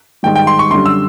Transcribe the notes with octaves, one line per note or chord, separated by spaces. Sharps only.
G#2 D#3 G3 G5
G5
C6
C#6
F#2 D3 G3 C6
E6